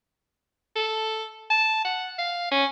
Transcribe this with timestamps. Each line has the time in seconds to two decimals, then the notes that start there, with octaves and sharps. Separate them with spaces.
0.76 A4
1.50 A5
1.85 F#5
2.19 F5
2.51 C#4